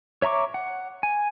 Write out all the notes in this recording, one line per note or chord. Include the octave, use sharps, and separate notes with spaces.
C#5 E5 A#5 C#6 D6
F#5
G#5